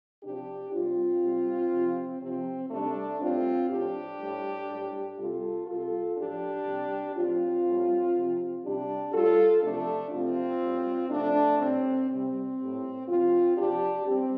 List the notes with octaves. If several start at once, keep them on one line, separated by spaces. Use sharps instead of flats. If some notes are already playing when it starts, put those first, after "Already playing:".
C3 F3 D4 G4
C3 G3 C4 F4
C3 G3
C3 F3
C3 F3 C4
C3 G3 A3 D4
A2 G3 C4 F4
A2 F3 D4 G4
A2 G3
A2 G3
C3 G3 F4 A4
C3 G3 F4 A4
A2 F3 D4 G4
C3 G3
A2 F3 C4 F4
A2 G3
C3 F3
C3 G3 D4 G4
A2 G3 F4 A4
C3 F3 A3 D4
C3 F3 C4 F4
A2 G3
C3 F3 A3 D4
A2 G3 C4
C3 G3 C4
A2 G3
C3 F3 C4 F4
C3 F3 D4 G4
G3 C4